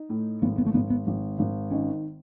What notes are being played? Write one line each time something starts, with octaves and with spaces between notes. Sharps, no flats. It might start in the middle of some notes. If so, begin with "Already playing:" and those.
Already playing: D#4
A2
G#1 B3
B3
A3
G#1 B3
B3
G#1
G#1
D#3 C#4